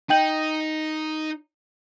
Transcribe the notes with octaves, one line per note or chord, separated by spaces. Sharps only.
D#4 G5 G6 F#7